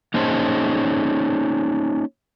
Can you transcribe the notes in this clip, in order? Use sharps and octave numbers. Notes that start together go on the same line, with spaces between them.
A#3 C#4 D#4 G#4 C5 A5